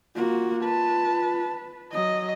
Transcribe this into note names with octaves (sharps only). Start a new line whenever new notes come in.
A#3 F4 F#4
B4 A5
F#3 D#5 D#6